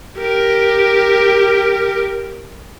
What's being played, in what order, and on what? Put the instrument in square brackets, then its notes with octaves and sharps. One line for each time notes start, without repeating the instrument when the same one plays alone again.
[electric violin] G4 A#4